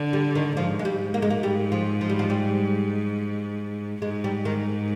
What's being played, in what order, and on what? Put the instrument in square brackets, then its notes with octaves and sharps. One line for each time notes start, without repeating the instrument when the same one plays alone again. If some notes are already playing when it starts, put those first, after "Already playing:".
Already playing: [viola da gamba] D3
[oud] G3
D#3
[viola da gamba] G#2 [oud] F3
[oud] G#3
G3
A#3
G#3
A#3
G3
F3
F3
G3
F3
G3
[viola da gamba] G#2 [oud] G#3
[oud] G3
D#3